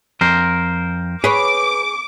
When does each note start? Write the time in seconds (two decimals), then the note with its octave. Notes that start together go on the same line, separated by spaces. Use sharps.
0.21 F2 A#4 C5
1.24 G#4 B4 C#5 D6